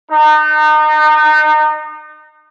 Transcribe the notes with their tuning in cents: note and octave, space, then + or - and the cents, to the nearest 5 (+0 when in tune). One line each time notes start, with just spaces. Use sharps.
D#4 -30